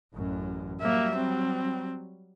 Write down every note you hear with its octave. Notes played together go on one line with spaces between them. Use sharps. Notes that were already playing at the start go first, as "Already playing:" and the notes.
A1 F#2
F#3 G3 A#3 E5
C4